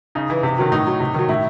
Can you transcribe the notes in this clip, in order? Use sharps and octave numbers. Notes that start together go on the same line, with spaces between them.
C#3 D#4
E3
C3
D#3 F#3
A2 D#4
F#3
C3
D#3 F#3
A2 E4